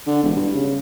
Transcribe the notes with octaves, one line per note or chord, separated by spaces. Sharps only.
D3
E1
G2
C#3